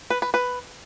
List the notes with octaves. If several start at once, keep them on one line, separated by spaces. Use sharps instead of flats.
B4
B4
B4